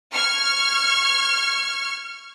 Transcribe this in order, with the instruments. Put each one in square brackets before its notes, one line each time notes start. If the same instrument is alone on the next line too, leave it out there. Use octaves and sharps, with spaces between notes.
[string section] C#6 F6 G#6